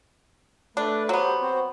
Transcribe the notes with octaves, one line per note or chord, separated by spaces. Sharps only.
A3 D4 B4
F#3 B3 G4 C5
C4 F#4 C5